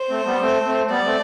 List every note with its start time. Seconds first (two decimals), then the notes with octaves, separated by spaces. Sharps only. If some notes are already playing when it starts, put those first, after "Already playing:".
Already playing: C5
0.09 A3 C4
0.26 G3 B3
0.41 A3 C4
0.65 A3 C4
0.89 G3 B3 D5
1.05 A3 C4